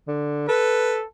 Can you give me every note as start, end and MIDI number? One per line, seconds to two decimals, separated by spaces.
0.07 0.44 50
0.48 1.03 69
0.48 0.98 71